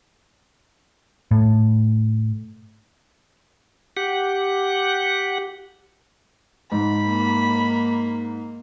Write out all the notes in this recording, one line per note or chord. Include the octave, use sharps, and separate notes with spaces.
A2
G4 F#5
G#2 B5
A#3